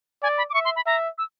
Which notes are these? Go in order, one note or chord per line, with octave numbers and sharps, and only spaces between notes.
D5 G#5
B5
D6
E5 C#6
C6
B5
E5 A#5
E6